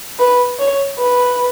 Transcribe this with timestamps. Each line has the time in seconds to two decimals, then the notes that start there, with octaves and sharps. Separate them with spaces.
0.19 B4
0.59 C#5
0.99 B4